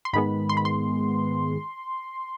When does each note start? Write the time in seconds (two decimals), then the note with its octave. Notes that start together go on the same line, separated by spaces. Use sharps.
0.05 C6
0.13 G#2 D#3 G#3 B3 B5
0.49 C6
0.57 B5
0.65 C6